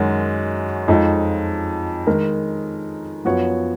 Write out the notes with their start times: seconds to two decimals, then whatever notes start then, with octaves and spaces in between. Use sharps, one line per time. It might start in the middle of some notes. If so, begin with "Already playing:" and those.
Already playing: F#2 D#3 G#3 D#4 F#4
0.88 F2 F3 G#3 D#4
2.07 D#3 G#3 D#4 A#4
3.25 F#2 F3 B3 F#4 C#5